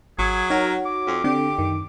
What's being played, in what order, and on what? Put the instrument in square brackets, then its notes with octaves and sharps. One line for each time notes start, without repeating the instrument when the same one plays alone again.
[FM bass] G#1 [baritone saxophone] F#3 [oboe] G#4
[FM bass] D#4 [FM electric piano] F#4 C#5 [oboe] A#4
[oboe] D6
[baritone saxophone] F2
[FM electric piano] D3 [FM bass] C4 [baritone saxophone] G4
[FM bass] F#2 [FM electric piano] D#3